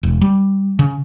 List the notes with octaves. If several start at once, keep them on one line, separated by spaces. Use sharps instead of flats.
E1
G3
C#3